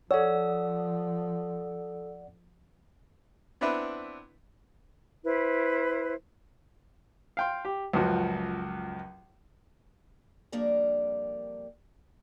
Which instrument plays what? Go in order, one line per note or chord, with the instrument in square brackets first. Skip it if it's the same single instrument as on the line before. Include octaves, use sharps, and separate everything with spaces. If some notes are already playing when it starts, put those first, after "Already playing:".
[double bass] F3 [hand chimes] A4 E6 [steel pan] C#5 [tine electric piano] D5 F#5
[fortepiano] B3 C4 D4 E4 B4
[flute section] E4 B4 C5
[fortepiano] F5 G5 C6
G4
C#2 F#2 F3 F#4
[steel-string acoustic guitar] F2 G3 A#3 D4 A#4 D5